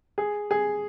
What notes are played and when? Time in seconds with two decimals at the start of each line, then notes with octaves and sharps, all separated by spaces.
0.18 G#4
0.51 G#4